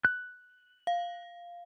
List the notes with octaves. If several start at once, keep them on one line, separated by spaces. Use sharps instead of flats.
F#6
F5